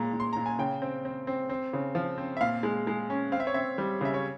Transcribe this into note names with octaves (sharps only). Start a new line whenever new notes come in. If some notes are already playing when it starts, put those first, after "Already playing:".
Already playing: A#2 G#3 A#5
A#2
C6
A#2 A#5
G#5
C#3 G5
C4
C4
C4
C4
C#3
F3
C4
E5
A#2 F5
G#3
G#3
C#4
C4 F5
E5
C#5
C4 E5
G3
C#3 E5
C#5